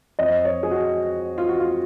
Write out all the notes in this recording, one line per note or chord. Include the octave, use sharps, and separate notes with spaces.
F2 F3 D#5
C#5
G#4
F#4
F4
F#4
F4